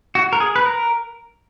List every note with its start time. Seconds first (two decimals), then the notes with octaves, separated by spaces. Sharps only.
0.15 F#4
0.33 A#4
0.40 G#4
0.56 B4
0.66 A#4